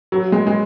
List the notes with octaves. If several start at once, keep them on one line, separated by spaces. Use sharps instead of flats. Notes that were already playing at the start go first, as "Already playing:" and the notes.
F#3
G#3
G#3